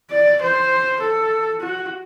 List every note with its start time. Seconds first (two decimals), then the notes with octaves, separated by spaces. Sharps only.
0.10 D5
0.41 C5
1.00 A4
1.60 F#4